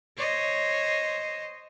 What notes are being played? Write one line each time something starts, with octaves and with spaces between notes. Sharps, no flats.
C5 C#5 D#5